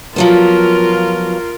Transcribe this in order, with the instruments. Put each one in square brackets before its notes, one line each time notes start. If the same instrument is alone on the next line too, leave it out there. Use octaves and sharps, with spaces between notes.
[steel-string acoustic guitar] F3 F#3 B3 [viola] F4 A#4